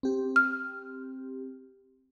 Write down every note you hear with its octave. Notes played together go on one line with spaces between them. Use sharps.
C4 G4
F6